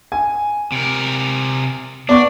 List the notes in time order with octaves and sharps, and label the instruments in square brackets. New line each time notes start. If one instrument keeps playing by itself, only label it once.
[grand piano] G#5
[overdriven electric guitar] C3 A#4
[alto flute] B3 [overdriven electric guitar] D4 [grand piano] D5 C#6